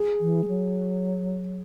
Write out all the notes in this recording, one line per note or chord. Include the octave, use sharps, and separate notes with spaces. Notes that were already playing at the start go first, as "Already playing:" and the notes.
Already playing: G#4
E3
G#3
F#3